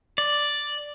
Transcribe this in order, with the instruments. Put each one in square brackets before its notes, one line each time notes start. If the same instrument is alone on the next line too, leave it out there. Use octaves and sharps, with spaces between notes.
[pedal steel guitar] D5